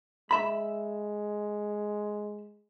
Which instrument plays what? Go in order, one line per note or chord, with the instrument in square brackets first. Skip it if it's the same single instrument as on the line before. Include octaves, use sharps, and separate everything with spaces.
[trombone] G#3 [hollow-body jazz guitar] E5 B5